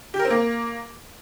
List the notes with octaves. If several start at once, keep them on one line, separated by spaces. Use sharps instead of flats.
G4
A#4
C4
A#3